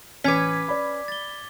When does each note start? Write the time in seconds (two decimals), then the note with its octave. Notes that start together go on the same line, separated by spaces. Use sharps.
0.24 A1 C#4 B4 D6 G#6 B6
0.69 D5 B5
1.08 A6 G7